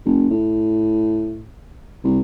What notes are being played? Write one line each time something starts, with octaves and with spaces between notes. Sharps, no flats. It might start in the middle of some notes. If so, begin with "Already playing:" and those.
F#1
A2
C2